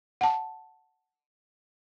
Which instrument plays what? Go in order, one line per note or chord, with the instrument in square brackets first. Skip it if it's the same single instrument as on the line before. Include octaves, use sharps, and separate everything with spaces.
[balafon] F#5 A5